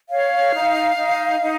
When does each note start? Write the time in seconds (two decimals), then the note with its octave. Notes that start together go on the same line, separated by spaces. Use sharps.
0.09 C#5 F5
0.53 D#4
0.97 D#4
1.41 D#4